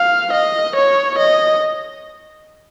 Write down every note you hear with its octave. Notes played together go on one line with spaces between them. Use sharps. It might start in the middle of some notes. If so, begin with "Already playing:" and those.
Already playing: F5
D#5
C#5
D#5